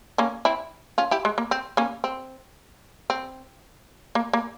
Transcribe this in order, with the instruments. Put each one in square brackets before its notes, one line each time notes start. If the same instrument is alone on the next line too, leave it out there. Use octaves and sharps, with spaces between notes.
[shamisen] A#3 C#4
C4 E4
C#4 F4
E4 G4
G#3
A#3
C4
A#3 C#4
C4
C4
A#3
A#3